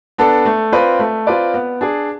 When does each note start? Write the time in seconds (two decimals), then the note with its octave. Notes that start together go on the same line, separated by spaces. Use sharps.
0.18 B3 D4 A4
0.45 A3
0.72 C4 F4 B4 D5
0.99 A3
1.27 C4 F4 B4 D5
1.54 B3
1.81 D4 G#4